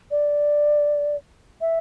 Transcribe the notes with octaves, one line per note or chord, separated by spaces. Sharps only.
D5
E5